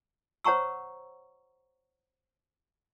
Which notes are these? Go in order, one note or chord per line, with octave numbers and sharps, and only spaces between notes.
C5 C#5 F#5 A#5 C#6 E6